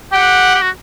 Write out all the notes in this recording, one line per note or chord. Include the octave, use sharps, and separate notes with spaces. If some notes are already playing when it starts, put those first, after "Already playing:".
G4 F#5
G4
F#4